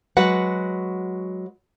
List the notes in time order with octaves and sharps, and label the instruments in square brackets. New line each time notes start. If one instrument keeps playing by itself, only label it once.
[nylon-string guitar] F#3 G#3 F#4 B4 F#5